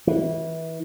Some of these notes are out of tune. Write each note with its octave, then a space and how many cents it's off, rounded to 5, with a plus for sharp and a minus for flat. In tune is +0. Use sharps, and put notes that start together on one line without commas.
E3 -25